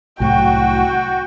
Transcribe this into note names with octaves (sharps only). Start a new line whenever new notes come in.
C2 A2 F#3 F#4 G5